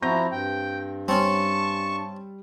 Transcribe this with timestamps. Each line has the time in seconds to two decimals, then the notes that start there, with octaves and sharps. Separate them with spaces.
0.02 F3 C4 E4 F#4 A#5 G6 A#6
0.32 G2 G5
1.08 G3 C4 C#4 A5 C#6